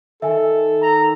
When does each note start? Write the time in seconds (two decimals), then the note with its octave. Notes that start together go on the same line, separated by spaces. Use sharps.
0.22 D#3 A4 E5 G#5
0.82 A#5